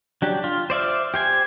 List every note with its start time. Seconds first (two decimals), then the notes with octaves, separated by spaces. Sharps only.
0.22 F#3 D4 G4
0.44 F4
0.70 C5 D5 E5 F5
1.14 G4 C5 G#5